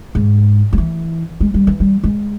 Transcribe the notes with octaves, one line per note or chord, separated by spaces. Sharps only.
G#2
G3
E3
G#3
G3
E3
G3
G#3